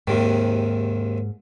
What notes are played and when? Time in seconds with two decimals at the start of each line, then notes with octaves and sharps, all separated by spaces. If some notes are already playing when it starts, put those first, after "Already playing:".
0.07 D#2 G#2 C3 D#3